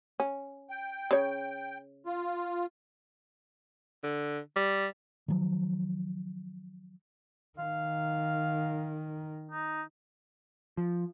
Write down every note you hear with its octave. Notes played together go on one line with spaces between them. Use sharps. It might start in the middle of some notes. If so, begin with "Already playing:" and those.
C#4
G5
C#3 C#5
F4
D3
G3
D#3 F3 F#3
D#3 F5
D#4
F3